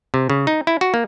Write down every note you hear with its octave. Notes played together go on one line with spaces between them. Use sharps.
C3
C#3
D#4
E4
F#4
A#3